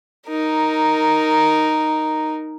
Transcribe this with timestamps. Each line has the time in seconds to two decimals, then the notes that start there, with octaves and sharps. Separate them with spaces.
0.28 D#4 A#4